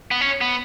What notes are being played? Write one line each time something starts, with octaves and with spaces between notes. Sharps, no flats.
B3
C#4
B3